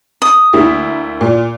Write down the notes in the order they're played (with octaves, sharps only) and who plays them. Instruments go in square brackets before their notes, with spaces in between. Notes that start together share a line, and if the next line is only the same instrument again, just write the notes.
[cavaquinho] D#6
[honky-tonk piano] D2 A#3 E4
A#2